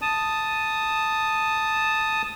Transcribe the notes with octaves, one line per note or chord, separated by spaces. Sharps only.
A5 D#6